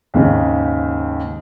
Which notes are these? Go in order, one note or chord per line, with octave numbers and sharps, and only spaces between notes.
D#2 G#2 C#3